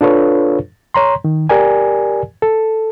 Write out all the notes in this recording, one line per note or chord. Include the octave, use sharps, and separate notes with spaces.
D4 F4 A4 B4 C#5
C#5 A#5 C6
D#3
G4 A#4 D5 G#5
A4